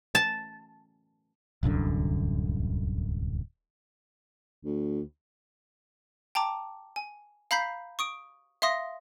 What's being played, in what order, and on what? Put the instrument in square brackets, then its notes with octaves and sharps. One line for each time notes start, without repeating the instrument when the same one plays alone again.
[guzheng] A5
[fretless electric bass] D1 C2 F#2 D3
[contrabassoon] D2
[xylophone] G5 A5 A#5 D6
G#5
F5 A#5 B5 G6 B6 C7
C#6 D#6 D7
E5 F5 C6 D#6 A#6